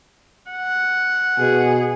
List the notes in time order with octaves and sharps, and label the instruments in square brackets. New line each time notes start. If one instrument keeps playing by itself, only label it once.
[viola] F#5
[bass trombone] B2 [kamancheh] G#4